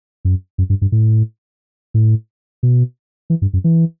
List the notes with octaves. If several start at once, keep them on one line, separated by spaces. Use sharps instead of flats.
F#2
F#2
G2
G2
A2
A2
B2
E3
G2
F#2
E3